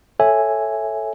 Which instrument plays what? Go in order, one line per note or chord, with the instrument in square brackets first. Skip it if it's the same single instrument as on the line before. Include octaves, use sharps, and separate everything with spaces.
[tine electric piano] A4 C#5 E5 G#5